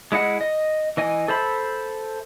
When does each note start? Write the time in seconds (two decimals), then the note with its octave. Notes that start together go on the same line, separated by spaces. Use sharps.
0.12 G#3 E4 D#5 F#5
0.41 D#5
0.97 E3 D#5 G#5
1.28 A4 C5 E5 B5